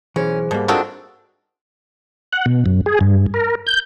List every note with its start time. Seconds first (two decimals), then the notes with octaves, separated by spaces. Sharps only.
0.16 B1 E3 C#4 G#4 C5
0.51 G#2 B2 G3 A#3
0.68 D#3 C4 D4 F4 F#4 A4
2.33 F#5
2.46 B2
2.66 F#2
2.86 G#4
3.01 G2
3.34 A#4
3.67 G6